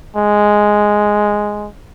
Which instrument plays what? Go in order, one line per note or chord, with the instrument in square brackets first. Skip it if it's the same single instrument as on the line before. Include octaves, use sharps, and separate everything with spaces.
[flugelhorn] G#3